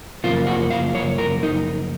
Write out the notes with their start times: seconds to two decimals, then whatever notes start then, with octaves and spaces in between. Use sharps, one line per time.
0.24 F#2 C#3 F3 A#3 F4
0.47 F#4
0.70 F5
0.95 C#5
1.18 A#4
1.43 D#4